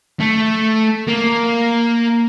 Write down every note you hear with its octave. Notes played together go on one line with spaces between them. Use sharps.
A3
A#3